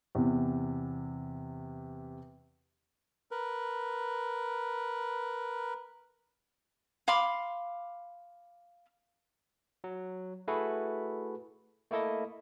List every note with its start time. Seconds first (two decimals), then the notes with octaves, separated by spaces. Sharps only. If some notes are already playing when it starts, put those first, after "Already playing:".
0.15 E2 C3
3.31 A#4 B4
7.08 F5 B5 C6 D6
9.84 F#3
10.48 A3 E4 F#4 G#4 A4 B4
11.91 A3 A#3 E4 A4 D#5